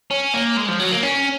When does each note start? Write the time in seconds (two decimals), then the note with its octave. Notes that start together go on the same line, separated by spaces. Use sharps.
0.11 C#4
0.34 A#3
0.57 G#3
0.68 F3
0.79 F#3
0.91 A#3
1.03 C#4